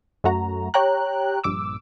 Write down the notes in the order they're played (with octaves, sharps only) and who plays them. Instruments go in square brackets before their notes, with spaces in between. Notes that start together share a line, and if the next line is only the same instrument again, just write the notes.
[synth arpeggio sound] F#2 A3 F#4 A#5
G4 C#5 G5 A#5 F#6
A#1 G2 D6 E6